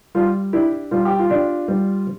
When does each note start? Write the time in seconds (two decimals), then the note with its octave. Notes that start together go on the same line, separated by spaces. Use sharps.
0.15 G3 F4
0.53 D4 E4 G4
0.91 G3 F4
1.05 G4
1.19 F4
1.30 D4 G4
1.68 G3